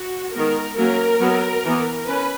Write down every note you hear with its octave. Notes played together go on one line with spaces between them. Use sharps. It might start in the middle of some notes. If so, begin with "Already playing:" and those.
Already playing: F#4
D#3 G#3 B3 A#4
F#3 A#3 C#4 A#4
F#3 B3
E3 B3
C#4 B4